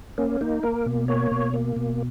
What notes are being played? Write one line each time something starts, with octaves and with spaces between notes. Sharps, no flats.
A#3 C#4
A#3 D#4
A#3 A#4
B2
A#3 C#5
B2
A#3
B2